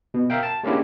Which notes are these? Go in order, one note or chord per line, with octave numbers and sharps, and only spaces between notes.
B2
A#4 E5 F5 G5
A5
G#3 A#3 C#4 D4 E4 G4